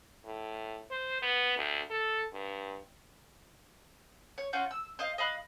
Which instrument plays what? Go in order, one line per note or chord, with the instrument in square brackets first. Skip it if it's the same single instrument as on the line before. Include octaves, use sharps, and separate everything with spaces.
[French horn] A2
C5
B3
D2
A4
G2
[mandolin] C#5
C#4 F4 F#4 G6
E6
C5 D#5 F5
D#5 F5 B5 F#6